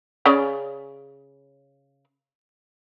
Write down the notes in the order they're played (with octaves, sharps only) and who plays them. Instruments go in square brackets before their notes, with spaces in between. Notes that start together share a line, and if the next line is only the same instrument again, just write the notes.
[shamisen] C#3 C#4 D5